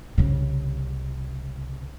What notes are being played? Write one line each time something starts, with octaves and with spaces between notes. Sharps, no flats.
C2 C#3